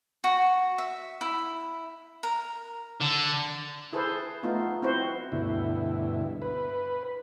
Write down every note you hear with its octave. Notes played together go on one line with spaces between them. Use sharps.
F#4
E5
E4
A#4
D3
E4 G#4 A4 B4 C5
A3 B3 D#4 F4
C4 E4 F#4 B4 C5
D2 G2 B2 E4
B4